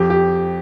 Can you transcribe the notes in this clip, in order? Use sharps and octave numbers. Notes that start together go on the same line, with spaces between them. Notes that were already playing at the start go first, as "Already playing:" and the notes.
Already playing: F2 G4
G4